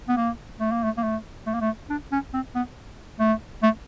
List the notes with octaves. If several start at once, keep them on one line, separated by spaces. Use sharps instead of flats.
B3
A#3
A3
A#3
A3
A#3
A3
A3
A#3
A3
D4
C#4
C4
B3
A3
A3